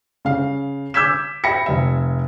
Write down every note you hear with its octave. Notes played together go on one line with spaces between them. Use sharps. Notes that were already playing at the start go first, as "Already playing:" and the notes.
C#3 F5
D6 E6 G6 G#6 B6 E7
E5 G5 B5 A#6 C#7
F1 E5